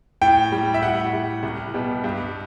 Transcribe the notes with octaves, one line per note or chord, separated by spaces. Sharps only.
A2 G5
G3
E5
A2 F#5
G3
C2
B2 G3
G2